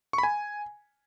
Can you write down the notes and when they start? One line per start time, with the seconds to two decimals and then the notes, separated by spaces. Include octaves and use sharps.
0.13 C#6
0.18 B5
0.23 G#5